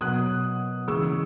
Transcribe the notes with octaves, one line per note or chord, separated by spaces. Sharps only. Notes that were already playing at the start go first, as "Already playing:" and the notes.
B2 F#3 D#6 F#6
C#3 E3 G#3 C#6 E6